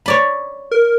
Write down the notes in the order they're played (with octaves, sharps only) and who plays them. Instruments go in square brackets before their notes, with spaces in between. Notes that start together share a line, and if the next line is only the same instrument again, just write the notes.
[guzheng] C#5 D5 B5
[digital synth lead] A#4